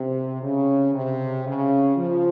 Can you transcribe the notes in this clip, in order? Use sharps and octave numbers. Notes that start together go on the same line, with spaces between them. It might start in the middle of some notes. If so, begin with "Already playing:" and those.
Already playing: C3
C#3
C3
C#3
F3